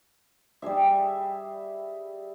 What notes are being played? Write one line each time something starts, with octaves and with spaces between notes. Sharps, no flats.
G3 G4 G#4 E5